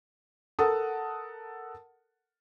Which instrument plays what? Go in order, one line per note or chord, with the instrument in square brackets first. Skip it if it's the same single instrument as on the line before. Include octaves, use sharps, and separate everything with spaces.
[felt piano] A4 A#4 F#5 A5 D#6